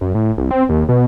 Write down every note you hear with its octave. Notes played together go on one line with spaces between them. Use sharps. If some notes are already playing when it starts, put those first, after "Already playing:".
F#2
A2
C2
C4
D#2
B2